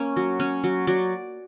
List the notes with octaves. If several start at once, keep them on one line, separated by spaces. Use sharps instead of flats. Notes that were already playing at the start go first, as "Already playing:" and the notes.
Already playing: A#3 C#4
F#3
C#4
F#3
F#3 D5